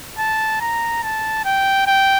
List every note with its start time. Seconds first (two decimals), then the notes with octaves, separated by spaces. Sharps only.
0.19 A5
0.61 A#5
1.03 A5
1.45 G5
1.87 G5